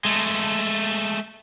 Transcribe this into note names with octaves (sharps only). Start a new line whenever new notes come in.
G#3 A3